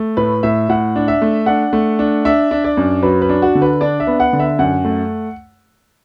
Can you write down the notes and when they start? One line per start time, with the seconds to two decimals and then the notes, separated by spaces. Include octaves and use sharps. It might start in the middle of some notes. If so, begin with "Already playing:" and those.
Already playing: A3
0.17 A2 B4
0.43 A2 E5
0.69 A2 F#5
0.96 D4
1.08 E5
1.22 A3
1.46 D4 F#5
1.73 A3
1.99 D4
2.25 D4 E5
2.51 D4
2.64 D5
2.77 F#2
3.03 F#3 B4
3.22 B4
3.29 D4
3.42 F#4
3.55 D3
3.62 B4
3.81 D4 D5
4.00 E5
4.07 B3
4.20 F#5
4.33 D3
4.40 E5
4.59 F#2 F#5
4.85 A3